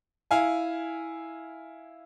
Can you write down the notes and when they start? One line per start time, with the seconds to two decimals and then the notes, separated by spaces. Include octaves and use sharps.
0.31 E4 F5 G#5